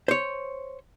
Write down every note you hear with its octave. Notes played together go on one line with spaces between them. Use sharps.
C5 C#5